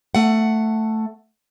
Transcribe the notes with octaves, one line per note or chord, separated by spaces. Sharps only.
A3 F#5